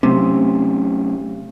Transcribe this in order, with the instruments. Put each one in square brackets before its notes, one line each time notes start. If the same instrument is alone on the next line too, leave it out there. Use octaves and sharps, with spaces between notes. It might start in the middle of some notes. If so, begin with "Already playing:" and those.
[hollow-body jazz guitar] C3 [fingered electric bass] F#3 A3 C#4